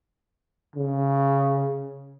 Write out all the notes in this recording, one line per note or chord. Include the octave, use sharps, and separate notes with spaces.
C#3